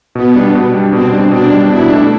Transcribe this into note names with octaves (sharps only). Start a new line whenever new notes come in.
B2 B3
G3 D4
B2
G3 D4
B2 C4
G3 D4
B2 D4
G3 D4
B2 E4
A3 D4